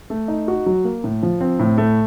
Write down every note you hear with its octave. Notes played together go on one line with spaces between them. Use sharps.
A3
D#4
F#4
F#3
A#3
A2
F3
C4
A2
A3